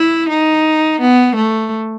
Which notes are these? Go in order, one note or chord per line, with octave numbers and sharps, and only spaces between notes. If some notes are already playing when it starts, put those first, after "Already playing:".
Already playing: E4
D#4
B3
A3